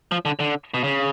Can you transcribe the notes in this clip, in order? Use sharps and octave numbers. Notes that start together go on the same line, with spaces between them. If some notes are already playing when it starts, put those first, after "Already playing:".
F3
D3
D3
B2
C#3